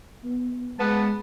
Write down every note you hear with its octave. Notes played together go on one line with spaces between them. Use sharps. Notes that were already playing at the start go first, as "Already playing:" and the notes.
B3
G#3 B3 A5